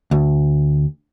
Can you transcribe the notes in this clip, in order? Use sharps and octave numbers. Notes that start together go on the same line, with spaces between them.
D2